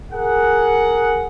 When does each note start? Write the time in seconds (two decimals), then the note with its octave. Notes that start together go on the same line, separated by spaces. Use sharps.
0.12 G#4 A#4 F#5